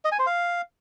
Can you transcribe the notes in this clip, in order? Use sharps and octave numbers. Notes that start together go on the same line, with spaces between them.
D#5
G#5
C5
F5